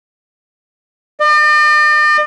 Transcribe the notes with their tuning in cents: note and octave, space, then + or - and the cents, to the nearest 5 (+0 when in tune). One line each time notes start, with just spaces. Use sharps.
D5 +45